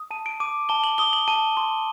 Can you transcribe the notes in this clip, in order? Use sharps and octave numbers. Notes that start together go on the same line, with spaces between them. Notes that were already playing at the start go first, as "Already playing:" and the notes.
Already playing: D#6
A5 D#7
D7
D6 D#7
A5 G7
F#7
D#6 G7
F#7
A5 D#7
C6